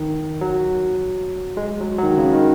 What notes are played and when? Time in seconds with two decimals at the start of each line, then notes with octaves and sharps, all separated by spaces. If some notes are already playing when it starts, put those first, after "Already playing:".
Already playing: D#3
0.41 F#3
1.57 G#3
1.80 F#3
1.98 F#3
2.03 D#3
2.18 C#3
2.33 D#3